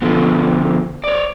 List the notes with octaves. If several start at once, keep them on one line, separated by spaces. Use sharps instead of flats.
B2 D3 F3 B3
C#5 D5